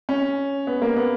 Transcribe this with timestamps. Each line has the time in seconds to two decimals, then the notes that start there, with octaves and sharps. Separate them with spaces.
0.09 C#4
0.67 B3
0.82 A#3
0.96 B3